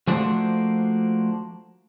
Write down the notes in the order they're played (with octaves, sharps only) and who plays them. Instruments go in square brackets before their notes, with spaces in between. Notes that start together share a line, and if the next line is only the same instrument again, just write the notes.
[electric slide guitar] F3 A3 A#3 D4 F#4 C5